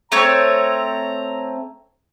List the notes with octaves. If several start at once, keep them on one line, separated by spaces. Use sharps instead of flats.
A3 C4 C#5 A#5